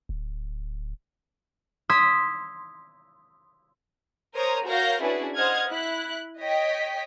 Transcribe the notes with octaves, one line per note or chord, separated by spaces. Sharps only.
D1
C6 D#6 E6 G#6 B6
A#4 C5 C#5 A#5 D#6
F#4 A#4 C#5 F5 G6 A#6
C#4 D4 E4 F#4 G#4 B4
C5 D#5 F#5 D#6 F6 G#6
E4 F#6
C#5 D#5 G5 B6